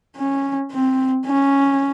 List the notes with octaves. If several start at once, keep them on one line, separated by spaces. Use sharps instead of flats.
C#4
C4
C#4